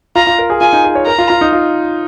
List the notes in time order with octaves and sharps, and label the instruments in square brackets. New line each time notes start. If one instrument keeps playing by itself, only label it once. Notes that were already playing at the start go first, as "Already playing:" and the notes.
[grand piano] F4 [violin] A#5
[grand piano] F4
A#4
G#4
[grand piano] F4 [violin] G#5
[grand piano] D#4
G#4
C#5
[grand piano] A#4 [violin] A#5
[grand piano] F4
F4
D#4
F4